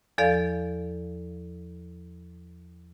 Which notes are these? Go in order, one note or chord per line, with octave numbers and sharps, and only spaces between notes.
E2 F3 A4 D5 F5